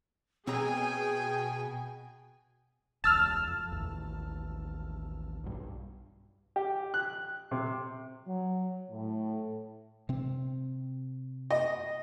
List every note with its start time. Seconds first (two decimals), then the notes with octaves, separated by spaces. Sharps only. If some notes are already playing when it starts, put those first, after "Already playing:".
0.47 B2 C4 G#4 C#5 G5 G#5 A#5
3.04 E1 C#2 A5 E6 F6
3.48 F2
3.72 A1 D#2
5.44 B1 G2
6.56 G4
6.94 F#6
7.51 C3
8.27 F#3
8.90 A2
10.09 C3 C4
11.50 D#5